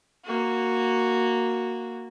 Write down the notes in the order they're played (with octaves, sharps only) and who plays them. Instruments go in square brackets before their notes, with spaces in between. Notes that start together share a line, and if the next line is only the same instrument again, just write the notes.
[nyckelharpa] A#3 F#4